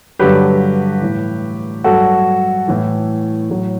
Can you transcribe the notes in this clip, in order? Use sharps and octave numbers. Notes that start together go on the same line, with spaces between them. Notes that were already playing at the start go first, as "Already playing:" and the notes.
G2 D3 F#3 G4 B4
A2 E3
G2 F#3 F#4 A4
A2 E3
A2 F#3